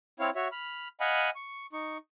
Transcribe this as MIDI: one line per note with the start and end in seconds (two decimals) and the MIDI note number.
0.20 0.30 60
0.20 0.30 64
0.20 0.30 73
0.20 0.30 77
0.35 0.48 66
0.35 0.48 73
0.35 0.48 76
0.52 0.88 83
0.52 0.88 89
1.00 1.30 75
1.00 1.30 77
1.00 1.30 78
1.00 1.30 80
1.00 1.30 83
1.36 1.66 85
1.73 1.98 63
1.73 1.98 85